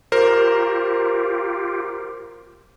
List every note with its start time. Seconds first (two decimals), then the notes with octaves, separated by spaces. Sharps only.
0.12 F4 G4 A#4 C5